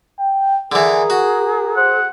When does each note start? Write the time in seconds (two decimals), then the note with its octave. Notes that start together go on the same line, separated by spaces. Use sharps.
0.19 G5
0.72 D3 E3 G#4 A#4
1.10 F#4
1.76 C5 F#5